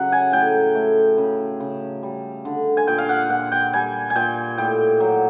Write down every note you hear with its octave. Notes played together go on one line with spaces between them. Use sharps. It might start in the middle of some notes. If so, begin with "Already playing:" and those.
Already playing: C#3 F#3 F#5
G#5
A2 G5
A3
C#3
C#3
G3
D3
G#5
A#2 G5
F5
F#5
A#2 F#5
G5
G3 G#5
G#5
A#2 G5
A2 G5
F#3